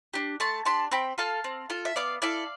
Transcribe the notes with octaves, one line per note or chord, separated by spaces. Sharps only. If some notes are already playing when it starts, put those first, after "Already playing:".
D4 G4
A3 A5 C6
D4 G4 A5 C6
C4 G5 B5
F4 A4 F5 A5
C4
F4 A4
E5
B3 D5 F5
E4 A4 D5 F5